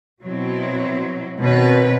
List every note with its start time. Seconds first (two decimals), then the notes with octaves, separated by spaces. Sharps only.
0.22 B2 F#3 C4 E4
1.39 B2 D#3 C4 C#4 B4